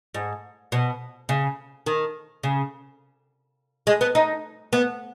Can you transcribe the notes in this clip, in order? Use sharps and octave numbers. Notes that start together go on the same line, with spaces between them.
G#2
B2
C#3
D#3
C#3
G#3
B3
D#4
B3